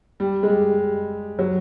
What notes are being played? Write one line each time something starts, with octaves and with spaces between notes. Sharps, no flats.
G3
G#3
G3
F#3